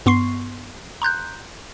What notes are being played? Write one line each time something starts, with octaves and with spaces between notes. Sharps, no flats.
G2 B3 C6 C#6 C7
A#5 C6 F#6 G6